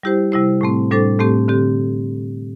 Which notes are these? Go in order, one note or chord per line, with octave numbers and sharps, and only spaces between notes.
G3 E4 G4 C5
C3 G3 E4 C5
A2 A3 C4
A2 G3 D4 A4 C5
A2 A3 C4 G4
D3 C4 G4